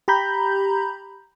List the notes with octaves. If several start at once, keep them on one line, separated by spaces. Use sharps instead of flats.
G4 A#5 B5 G6